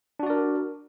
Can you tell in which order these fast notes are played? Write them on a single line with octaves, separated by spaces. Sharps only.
D4 F#4 D5 A#4